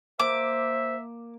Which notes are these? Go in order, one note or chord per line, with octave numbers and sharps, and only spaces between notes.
A#3 C5 E5 D6